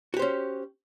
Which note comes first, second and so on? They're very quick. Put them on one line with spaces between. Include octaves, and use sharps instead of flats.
F#4 G4 C5 C#4